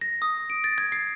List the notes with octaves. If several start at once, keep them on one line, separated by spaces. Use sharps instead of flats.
A#6
D#6
D7
A6
G#6
C7